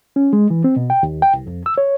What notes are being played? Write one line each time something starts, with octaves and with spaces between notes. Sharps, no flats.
C#4
G#3
E3
C4
B2
G5
D#2
G5
C2
F2
E6
C#5